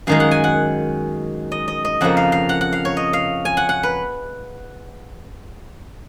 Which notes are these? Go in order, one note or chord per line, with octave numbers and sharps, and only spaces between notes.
F#2 D#3 G#3 F5
F#5
G#5
F#5
D#5
D#5
D#5
F2 C#3 F3 A#3 F#5
F5
F5
F#5
F#5
F5
C#5
D#5
F5
G#5
F#5
F#5
B4